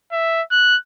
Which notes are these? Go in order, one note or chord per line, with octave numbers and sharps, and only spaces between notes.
E5
F#6